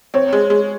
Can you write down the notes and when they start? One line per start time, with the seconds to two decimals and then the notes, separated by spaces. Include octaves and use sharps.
0.14 C4 C#5
0.33 G#3
0.50 G#3